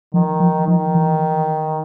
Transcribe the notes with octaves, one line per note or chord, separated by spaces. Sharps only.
D#3 F3
F3
D#3 F3
E3